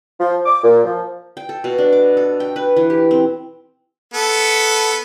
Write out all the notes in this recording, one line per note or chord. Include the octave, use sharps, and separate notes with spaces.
F3
D6
A#2
F3
G5
A4
B2
D4
D6
A4
G5
B4
E3
G4
C4
B3 A4